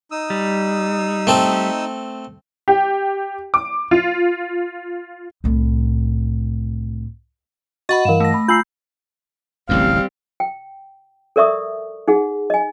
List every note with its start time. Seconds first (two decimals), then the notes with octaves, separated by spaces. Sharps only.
0.11 D#4 D#6 E6
0.30 G3
1.27 A3 C4 A4
2.68 G4
3.54 D6
3.91 F4
5.44 C2 A2
7.89 F#4 D#5 F#5 B5 C#6 A6
8.05 G2 E3 A#4 F5 E7
8.20 A3 A#6
8.34 B5
8.48 F4 G#5 A#5 B5 E6 G6 C7 F#7
9.69 D1 A1 F#2 G3 C4 F5
10.40 G5
11.36 A4 A#4 D5 E5 C#6 D#6
12.08 D#4 G#4 F#5
12.50 D#5 G#5